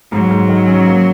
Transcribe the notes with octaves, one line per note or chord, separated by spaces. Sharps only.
G#2 F#3
G#2
D#3
C#4
A#3